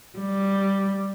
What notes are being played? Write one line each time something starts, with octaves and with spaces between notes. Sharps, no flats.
G3